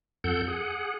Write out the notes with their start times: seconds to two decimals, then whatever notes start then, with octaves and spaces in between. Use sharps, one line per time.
0.24 F2 A4 F#5 G6
0.48 G#4 F#5